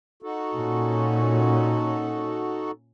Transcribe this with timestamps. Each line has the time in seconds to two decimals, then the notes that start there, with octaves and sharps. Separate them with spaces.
0.22 D#4 F#4 A4
0.55 A#2 C#4